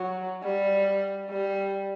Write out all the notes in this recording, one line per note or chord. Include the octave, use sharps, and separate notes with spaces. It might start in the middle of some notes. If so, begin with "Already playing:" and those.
Already playing: F#3
G3
G3